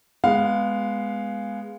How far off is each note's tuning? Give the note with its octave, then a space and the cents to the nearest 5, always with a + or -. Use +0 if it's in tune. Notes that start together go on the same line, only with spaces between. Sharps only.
G#3 +0 B3 +0 F5 +0